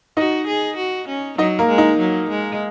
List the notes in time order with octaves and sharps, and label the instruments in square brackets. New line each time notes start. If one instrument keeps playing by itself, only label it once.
[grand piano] D#4 D#5 [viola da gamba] F#4
[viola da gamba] G#4
F#4
C#4
[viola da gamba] F#3 [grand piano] D#4 D#5
[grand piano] A#3 A#4
[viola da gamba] G#3
[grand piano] D#4
[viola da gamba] F#3
G#3